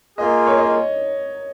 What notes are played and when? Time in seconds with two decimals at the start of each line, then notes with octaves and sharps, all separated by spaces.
0.18 A#3 F4 G#4 D#5
0.47 C#5
0.58 D#5